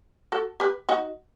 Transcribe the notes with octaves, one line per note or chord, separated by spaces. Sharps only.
F#4 A4
G4 B4
D#4 F#4